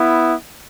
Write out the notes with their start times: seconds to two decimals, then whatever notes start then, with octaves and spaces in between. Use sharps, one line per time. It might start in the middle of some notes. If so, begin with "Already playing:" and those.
Already playing: B3 E4